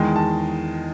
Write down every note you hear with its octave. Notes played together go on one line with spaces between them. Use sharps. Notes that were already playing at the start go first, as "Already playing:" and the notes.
Already playing: E2 D#3 G#3
A5